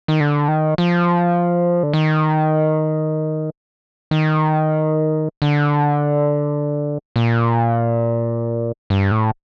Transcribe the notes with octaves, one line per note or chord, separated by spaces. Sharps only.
D#3
D3
D#3
F3
D3
D#3
D#3
D3
A#2
G2
A2